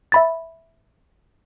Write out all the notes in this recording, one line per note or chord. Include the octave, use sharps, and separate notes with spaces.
E5 B5 A6